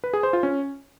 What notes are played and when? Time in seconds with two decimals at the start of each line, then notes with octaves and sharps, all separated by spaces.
0.04 B4
0.13 G#4
0.23 C5
0.33 F4
0.43 C#4